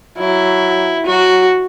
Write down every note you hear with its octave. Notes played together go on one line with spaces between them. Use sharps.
F#3 E4
F#3 F#4